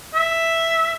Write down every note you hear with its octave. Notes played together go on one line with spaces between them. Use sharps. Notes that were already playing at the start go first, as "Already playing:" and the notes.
E5